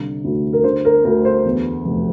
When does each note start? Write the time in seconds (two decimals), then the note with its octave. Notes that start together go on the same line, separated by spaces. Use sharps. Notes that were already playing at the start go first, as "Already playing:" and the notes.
Already playing: C2 D3
0.24 D2
0.53 A#4
0.64 D3 C5
0.85 A#4
1.04 D2 A#4
1.25 C5
1.45 E2
1.85 F1